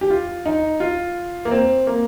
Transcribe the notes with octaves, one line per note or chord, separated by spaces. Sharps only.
G4
F4
D#4
F4
A#3
C4
A#3